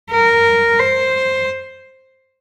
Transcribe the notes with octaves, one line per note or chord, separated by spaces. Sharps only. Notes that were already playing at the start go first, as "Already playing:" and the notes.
A#4
C5